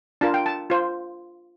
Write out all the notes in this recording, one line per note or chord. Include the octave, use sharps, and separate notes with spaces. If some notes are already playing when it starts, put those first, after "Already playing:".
D4 F4 A#4 A5
G5
A5
F4 C5